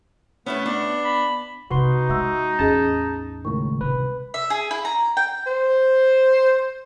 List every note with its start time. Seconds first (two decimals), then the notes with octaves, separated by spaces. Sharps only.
0.46 A3 B3 C#4 E4 A4
0.66 B3 D4
1.05 B5
1.70 C3 C4 D#4 F#4 B4 C6
2.09 G#3 F#4 E5 E6
2.59 A1 E2 C#4 G#4 D#5 A5
3.45 C#2 A2 D#3 A#4 C#6
3.81 C3 G3 B4
4.34 E5
4.50 G#4
4.71 E4
4.85 A#5
5.17 G5
5.46 C5